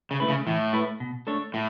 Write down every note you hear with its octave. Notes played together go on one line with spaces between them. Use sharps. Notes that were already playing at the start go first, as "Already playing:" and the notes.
C#3
A3 E4 B4
C#3
A2 E3
A3 E4 B4
B2
A3 D4 A4 C#5
A2